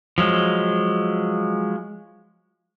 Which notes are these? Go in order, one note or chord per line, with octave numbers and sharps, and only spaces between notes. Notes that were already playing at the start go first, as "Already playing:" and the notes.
F3 F#3 G#3